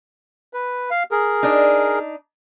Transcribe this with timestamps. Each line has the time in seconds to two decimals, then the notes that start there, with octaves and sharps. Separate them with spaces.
0.53 B4
0.90 F5
1.11 G#4 A#4
1.43 D4 D#4